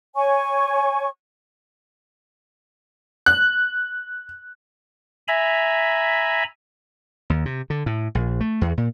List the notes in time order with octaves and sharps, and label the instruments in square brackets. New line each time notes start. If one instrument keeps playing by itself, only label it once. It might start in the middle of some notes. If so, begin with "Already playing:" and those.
[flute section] C#5 G#5 C#6
[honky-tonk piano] F#6
[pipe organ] E5 G#5 A#5 B5
[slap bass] D#2
C3
D3
A2
A#1
A3
E2
A#2